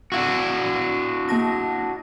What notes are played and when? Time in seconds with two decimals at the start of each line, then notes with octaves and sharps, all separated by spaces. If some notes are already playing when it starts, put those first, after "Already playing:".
0.12 D4 E4 F#4
1.29 A#3 A5 A#6